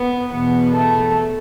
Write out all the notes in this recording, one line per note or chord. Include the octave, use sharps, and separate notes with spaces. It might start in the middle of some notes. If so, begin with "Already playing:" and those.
Already playing: B3
E2 B2 B3
A3